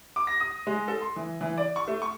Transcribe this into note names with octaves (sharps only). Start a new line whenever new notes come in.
D6
A#6
D#6
G#3
A4
C6
E3
E3
D5
C#6
A3
C#6